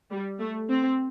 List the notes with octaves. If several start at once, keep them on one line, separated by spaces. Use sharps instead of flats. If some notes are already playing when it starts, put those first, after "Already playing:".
G3
A3
C4